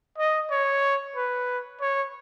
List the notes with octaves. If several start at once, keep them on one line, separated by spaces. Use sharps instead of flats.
D#5
C#5
B4
C#5